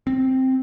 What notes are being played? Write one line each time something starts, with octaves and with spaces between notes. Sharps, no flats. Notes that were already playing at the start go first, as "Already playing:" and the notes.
C4